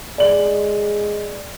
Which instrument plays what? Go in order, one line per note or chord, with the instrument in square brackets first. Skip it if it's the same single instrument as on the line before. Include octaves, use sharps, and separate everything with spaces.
[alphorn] G#3 [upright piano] D5 F#7